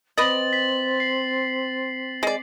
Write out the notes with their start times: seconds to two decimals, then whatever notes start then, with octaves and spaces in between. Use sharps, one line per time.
0.18 C4 B4 D5 D#5 A6 F#7
0.53 B6
1.00 C7
2.23 G#3 D5